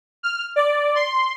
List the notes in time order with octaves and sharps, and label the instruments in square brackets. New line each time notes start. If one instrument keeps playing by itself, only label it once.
[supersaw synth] F6
D5
C6